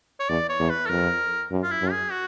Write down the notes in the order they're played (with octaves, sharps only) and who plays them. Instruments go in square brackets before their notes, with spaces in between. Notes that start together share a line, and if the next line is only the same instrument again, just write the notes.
[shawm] C#5
[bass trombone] E2 [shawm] D5
[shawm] C#5
[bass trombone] E2
[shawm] B4
A4
[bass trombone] F2 [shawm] A#4
[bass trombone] F#2
[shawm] F4
E4
[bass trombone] F#2
[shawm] G#4
F#4